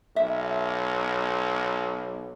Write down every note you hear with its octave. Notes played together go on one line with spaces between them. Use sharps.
B1 E5